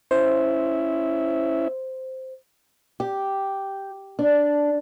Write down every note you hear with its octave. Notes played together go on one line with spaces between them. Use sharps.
C#4 E4 C5 E5
G4
D4